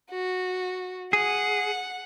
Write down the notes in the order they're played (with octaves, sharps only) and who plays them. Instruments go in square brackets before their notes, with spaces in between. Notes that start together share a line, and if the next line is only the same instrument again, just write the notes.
[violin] F#4
[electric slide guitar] G#4 [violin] F#5